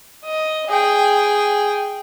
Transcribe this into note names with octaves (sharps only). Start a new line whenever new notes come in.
D#5
G#4 G5